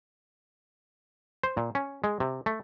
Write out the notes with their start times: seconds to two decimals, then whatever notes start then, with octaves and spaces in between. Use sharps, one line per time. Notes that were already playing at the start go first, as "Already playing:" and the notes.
1.43 C5
1.57 A#2
1.75 C#4
2.04 G#3
2.20 C3
2.46 A3